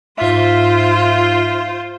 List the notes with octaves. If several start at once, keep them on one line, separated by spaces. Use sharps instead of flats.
G#2 F4 C5 E5